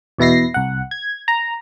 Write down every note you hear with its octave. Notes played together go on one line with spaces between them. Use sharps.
E2 B2 E4 A#6 C7
C2 F#5
G#6
A#5